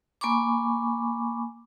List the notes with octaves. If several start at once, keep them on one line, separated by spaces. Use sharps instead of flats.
A#3 G#5 B5 C#6 D6